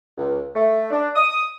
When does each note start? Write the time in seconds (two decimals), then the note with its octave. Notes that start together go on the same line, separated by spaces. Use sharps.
0.18 C#2
0.55 A3
0.91 D4
1.15 D#6